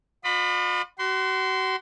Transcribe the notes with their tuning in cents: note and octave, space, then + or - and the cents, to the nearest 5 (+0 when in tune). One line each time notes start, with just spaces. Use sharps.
F4 +45 D#5 -45 B5 +15
F#4 +35 C6 -20